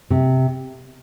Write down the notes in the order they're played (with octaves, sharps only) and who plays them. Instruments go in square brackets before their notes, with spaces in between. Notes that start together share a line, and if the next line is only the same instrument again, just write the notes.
[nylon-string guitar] C3